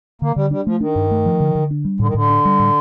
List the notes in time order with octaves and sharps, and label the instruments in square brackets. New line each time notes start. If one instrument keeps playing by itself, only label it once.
[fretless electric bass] D3 [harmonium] A#3
[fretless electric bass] D3 [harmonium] G3
[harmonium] G3 [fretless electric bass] D4
[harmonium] F3 [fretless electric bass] A3
[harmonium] D#3 [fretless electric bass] D4
[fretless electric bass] G2
A3
F3
D3
D3
D4
G3
[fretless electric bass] A2 [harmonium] D3
[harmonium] D#3
[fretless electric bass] A2 [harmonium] D3
[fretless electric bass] D4
G3
A2